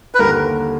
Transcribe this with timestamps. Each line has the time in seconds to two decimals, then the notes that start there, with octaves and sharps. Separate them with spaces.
0.15 B4
0.19 D#2 D3 G3 A#3 A#4